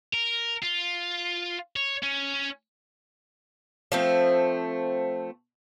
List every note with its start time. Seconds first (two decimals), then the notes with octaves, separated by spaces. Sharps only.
0.14 A#4
0.63 F4
1.76 C#5
2.03 C#4
3.92 F3 A3 C4